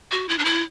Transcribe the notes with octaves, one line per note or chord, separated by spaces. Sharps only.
F#4
E4
D4
E4